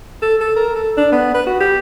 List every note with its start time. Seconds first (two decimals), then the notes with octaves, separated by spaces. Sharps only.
0.22 A4
0.41 A4
0.56 A#4
0.75 A4
0.97 D4
1.12 B3
1.34 B4
1.47 F#4
1.60 G4